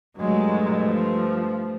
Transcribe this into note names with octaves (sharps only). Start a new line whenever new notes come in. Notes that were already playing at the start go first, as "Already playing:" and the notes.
G2 F#3 G#3 A3
F3